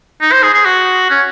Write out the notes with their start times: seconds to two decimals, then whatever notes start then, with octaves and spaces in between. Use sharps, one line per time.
0.21 D#4
0.32 C5
0.43 G#4
0.54 G#4
0.66 F#4
1.10 C#4